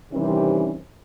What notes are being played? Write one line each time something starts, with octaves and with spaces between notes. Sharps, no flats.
C3 D#3 E3 G3 C4 C#4